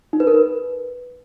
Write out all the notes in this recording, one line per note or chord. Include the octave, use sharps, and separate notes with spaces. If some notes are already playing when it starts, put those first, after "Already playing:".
D#4
B4
A#4
B4